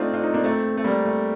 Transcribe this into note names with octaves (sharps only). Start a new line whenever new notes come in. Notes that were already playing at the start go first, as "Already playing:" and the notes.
Already playing: A3 C4 D4 D#4 F4
D4 F4
C4 D#4
A#3 D4
A3 C4
A3
G3 A#3
A3